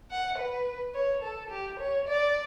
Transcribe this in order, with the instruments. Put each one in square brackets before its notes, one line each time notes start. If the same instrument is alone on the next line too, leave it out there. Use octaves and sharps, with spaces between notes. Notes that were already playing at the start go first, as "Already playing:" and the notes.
[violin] F#5
B4
C#5
A4
G4
C#5
D5